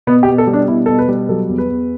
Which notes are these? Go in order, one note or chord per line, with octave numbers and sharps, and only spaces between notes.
B2 B3
G4
B2
A4
G3
D4
B2 E4
B2 A4
B4
G3
F#3 A4
E2
B4
E2